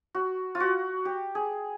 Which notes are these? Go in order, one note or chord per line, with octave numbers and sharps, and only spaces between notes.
F#4
F4
F#4
G4
G#4